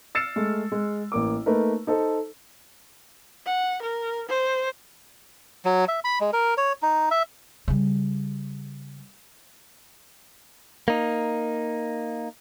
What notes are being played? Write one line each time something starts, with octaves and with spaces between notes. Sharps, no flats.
E6 F6 A6 C7 C#7 E7
G#3 A3
G#3
A1 A#3 D6
A3 A#3 D#4 A#4 B4
D#4 A4 C5
F#5
A#4
C5
F#3
E5
B5
G#3
A#4
C#5
D#4
E5
C#3 G3
A#3 D#4